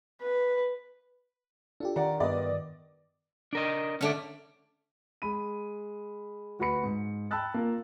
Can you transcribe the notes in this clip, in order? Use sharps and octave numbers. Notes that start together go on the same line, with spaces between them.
B4
D4 F4 G4 A4
D#3 D5 F#5 A#5
G2 B3 D5 D#5
D4 A#4 D#5
D3 A3 C#4 D5
G#3 B5 D#7
D2 F#4 B4 B5 C#7
G#2
G5 A5 B5 E6 F#6 A6
A#3 F4 A#4